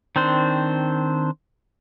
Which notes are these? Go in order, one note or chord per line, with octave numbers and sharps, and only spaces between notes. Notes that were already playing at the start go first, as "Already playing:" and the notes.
D#3 C4 D4 C5